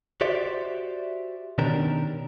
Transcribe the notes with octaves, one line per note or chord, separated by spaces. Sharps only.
F#4 G4 C5 D5 E5
B2 D#3 C#4 D4 G4 A#4